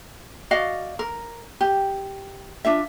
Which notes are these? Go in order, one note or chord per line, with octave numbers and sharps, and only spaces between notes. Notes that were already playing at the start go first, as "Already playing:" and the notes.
F#4 D5 D#5 F5
A#4
G4
D4 F4 E5